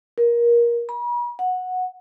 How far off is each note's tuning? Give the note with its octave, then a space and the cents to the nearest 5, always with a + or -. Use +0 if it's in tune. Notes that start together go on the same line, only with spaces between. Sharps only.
A#4 +20
B5 -45
F#5 -10